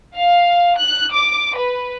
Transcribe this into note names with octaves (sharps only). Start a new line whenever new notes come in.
F5
F#6
D6
B4